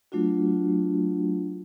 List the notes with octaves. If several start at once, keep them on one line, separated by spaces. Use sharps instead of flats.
F#3 A3 D4 F4 F#4